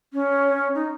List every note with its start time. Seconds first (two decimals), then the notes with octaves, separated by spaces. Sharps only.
0.13 C#4
0.75 D#4